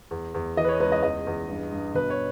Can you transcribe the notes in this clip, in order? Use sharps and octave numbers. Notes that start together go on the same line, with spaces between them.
E2
E2
E3 D#5
B4
C#5
C#2 B4
D#5
E2 D#5
E2
G2
G2
B2 B4
C#5